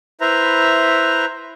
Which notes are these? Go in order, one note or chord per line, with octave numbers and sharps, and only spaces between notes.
E4 B4 C5 E5 A#5